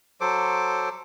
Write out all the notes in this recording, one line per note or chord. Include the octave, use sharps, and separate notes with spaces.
F#3 A4 C5 D6